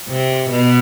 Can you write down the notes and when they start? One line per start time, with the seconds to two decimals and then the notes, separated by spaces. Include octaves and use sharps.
0.09 C3
0.50 B2